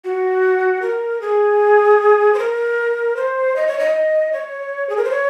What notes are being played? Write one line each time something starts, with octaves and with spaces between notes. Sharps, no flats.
F#4
A#4
G#4
C5
A#4
C5
D#5
C#5
D#5
C#5
G#4
A#4
C5
C#5